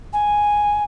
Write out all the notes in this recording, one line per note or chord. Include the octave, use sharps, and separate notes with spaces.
G#5